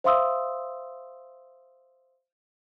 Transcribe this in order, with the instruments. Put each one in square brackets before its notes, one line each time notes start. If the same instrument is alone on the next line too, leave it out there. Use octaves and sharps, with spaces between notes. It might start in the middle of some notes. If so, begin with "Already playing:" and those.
[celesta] C5 E5 F5 C6 D#6 E6